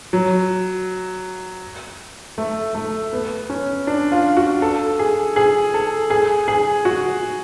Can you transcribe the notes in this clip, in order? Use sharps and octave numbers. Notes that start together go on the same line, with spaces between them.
F#3
A3
A3
B3
C#4
D4
F4
F#4
A4
G#4
G#4
A4
G#4
G#4
F#4